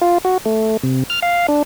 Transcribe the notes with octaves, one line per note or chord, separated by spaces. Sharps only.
F4
F#4
A3
C3
F6
F5
D4